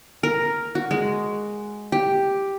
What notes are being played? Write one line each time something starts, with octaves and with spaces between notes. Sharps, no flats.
A#4
F#4
G#3
G4